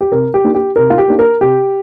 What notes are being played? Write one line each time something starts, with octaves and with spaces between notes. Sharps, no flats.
G4
C3 A#4
G4
A#3 D4 F4
G4
C3 A#4
F4
G4
A#3 D4 F4
A#4
C3 G4